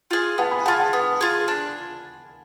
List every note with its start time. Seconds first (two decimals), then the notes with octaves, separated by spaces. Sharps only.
0.11 F4 G#4
0.38 B3 F#5 A5
0.51 G#5 B5
0.66 F4 G#4 F#5 A5
0.80 F#5 A5
0.93 B3
1.21 F4 G#4
1.48 D4